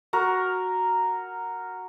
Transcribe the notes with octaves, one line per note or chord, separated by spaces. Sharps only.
F#4 A#4